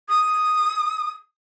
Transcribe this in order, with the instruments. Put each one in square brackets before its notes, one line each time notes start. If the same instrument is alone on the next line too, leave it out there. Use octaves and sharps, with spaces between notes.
[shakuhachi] D#6